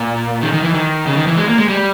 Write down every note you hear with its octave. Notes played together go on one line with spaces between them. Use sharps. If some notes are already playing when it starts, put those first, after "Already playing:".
Already playing: A#2
D#3
D#3
E3
D#3
C#3
D#3
E3
G#3
A#3
G#3
G3